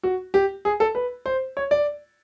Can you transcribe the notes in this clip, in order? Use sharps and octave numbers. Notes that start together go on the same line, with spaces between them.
F#4
G4
G#4
A4
B4
C5
C#5
D5